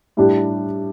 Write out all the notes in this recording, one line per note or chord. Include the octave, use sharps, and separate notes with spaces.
A2 G3 D4 G4